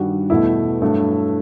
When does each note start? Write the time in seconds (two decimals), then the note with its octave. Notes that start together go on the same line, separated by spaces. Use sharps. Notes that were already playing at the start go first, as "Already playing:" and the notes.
Already playing: G2 D#3 G3 F#4
0.30 E2 B2 A3 E4
0.82 G2 F#3 A3